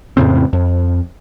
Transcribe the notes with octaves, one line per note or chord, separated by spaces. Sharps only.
F2 A2 C#3 C4
F2